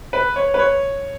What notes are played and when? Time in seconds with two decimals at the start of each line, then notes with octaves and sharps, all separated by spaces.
0.13 B4
0.36 C#5
0.54 B4
0.59 C#5